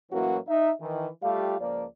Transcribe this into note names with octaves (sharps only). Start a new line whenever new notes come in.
A2 E3 F#3 A#3 C#4 F#4
D#4 E5
D#3 E3
G3 A3 F4 G4 F5
C#2 F3 A#3 D5